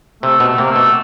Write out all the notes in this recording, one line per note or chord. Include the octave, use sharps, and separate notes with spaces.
C3 A3
B2
A3
C3 A#3
A3
B2